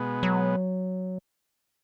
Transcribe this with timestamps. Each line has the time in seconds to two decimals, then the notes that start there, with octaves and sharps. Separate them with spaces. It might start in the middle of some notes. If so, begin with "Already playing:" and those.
Already playing: B2 G#3 B3
0.23 F#3